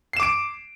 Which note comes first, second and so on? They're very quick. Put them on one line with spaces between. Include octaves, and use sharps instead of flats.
C7 E7 D6 D7